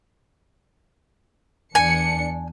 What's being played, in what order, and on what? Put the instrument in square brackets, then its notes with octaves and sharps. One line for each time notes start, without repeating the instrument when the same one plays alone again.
[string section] E2 D4 C#7 [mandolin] G#5